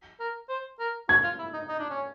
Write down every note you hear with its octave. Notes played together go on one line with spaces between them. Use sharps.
A#4
C5
A#4
F#4 G#6
F4
E4
D#4
D#4
D4
C#4